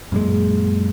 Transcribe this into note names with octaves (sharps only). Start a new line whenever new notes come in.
F#2 A#2 G#3